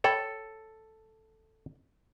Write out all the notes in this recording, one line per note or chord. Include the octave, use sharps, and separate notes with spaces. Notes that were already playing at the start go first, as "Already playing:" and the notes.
A4 C#5 G5 B5